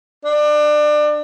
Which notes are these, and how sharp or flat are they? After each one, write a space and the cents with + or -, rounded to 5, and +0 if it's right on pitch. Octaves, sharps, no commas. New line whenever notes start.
D4 +25